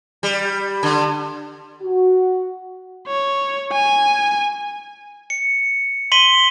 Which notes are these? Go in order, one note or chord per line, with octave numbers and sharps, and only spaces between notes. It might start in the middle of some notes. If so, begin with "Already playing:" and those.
G3
D3
F#4
C#5
G#5
C#7
C6 B6 D#7 F#7 G7